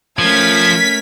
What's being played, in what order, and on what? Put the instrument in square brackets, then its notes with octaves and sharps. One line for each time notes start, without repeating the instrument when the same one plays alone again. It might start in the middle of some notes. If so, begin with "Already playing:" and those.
[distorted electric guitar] F3 [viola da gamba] A3 C#4 A#4 [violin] G#6 [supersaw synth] B6